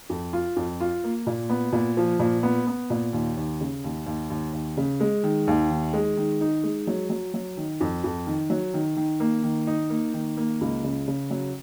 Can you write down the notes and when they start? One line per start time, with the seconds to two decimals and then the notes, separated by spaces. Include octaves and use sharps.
0.10 F2
0.33 F4
0.56 F2
0.81 F4
1.04 A#3
1.27 A#2
1.50 B3
1.73 A#2
1.97 F3
2.19 A#2
2.43 B3
2.67 B3
2.90 A#2
3.13 D#2
3.37 D#2
3.61 C#3
3.84 D#2
4.06 D#2
4.30 D#2
4.53 D#2
4.77 C#3
5.00 G#3
5.24 D#3
5.47 D#2
5.71 D#3
5.94 G#3
6.17 D#3
6.41 D#4
6.64 G#3
6.87 F#3
7.10 F#3
7.34 F#3
7.57 D#3
7.81 F2
8.04 F2
8.27 D#3
8.50 F#3
8.74 D#3
8.97 D#3
9.20 A#3
9.43 D#3
9.67 D#4
9.90 A#3
10.14 D#3
10.37 A#3
10.61 C#2
10.84 C#3
11.08 C#3
11.30 F#3